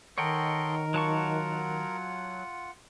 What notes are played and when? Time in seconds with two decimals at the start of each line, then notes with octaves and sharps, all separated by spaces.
0.18 D#3 A4 A#4 C#5 D#5 F#5 G5 C6
0.94 F#3 F4 F#5 A5 C#6